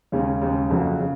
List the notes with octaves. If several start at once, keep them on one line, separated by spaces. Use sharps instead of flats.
D#2 C#3 G#3 C#4
D#2 C#3 G#3 C#4
F#1 F2 C#3 F#3
C#3